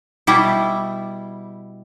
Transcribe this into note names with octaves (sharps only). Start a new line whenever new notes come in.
B2 G3 E4